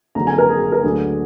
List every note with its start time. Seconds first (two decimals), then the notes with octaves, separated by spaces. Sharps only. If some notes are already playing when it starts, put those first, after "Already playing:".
0.15 F#1 F2 D3 F#3 A#5
0.27 G#5
0.38 A#4
0.49 G#4
0.61 G#4
0.72 A#4
0.84 D2 D3 F#3 B3 D4 G#4